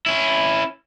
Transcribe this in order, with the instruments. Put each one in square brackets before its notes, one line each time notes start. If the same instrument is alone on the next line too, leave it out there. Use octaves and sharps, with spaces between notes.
[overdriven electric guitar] C#4 E4